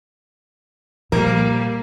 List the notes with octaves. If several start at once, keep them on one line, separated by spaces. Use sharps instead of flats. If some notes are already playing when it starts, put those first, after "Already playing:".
A#2 F3 G3 A#3 A#4